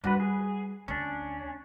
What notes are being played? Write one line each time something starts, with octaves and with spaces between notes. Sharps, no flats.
G3 D4 F#4 B4
G#4
D2 C#4 D4